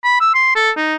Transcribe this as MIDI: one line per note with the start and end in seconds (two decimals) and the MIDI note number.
0.04 0.16 83
0.21 0.33 88
0.34 0.54 84
0.56 0.70 69
0.77 0.95 63